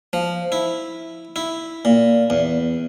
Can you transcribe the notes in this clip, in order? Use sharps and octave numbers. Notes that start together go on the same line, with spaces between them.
F3
E4
E4
A#2
E2